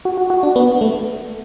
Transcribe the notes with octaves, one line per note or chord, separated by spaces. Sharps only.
F#4
F#4
F#4
D4
B3
A3